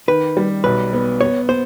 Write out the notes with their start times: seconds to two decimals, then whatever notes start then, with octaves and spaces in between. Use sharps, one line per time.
0.08 D#3 B4
0.37 G3
0.64 B1 B4
0.93 B3
1.21 B3 C#5
1.49 B3 C5